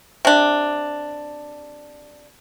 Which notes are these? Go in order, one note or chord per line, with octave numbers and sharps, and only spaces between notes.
C3 D4